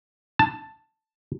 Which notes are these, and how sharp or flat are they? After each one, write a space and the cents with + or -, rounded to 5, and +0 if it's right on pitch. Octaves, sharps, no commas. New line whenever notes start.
A5 +5